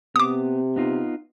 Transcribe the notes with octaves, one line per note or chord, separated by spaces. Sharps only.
C3 B3 D6 D#6
B3 D#4 F4